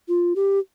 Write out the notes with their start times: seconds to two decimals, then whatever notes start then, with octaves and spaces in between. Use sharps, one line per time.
0.08 F4
0.36 G4